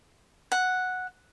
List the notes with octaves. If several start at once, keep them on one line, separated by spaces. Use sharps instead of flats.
F#5